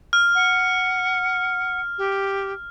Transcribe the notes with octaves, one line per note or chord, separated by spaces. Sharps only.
F6
F#5
G4